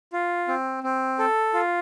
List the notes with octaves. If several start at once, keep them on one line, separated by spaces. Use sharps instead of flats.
F4
C4
C4
A4
F4